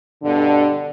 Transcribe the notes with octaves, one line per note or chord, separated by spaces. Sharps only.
G2 B2 D3